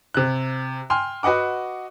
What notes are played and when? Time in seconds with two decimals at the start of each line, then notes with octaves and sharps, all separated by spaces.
0.14 C3 F#6
0.90 G5 G#5 C6 F6
1.23 F#4 B4 D#5 F#5 D6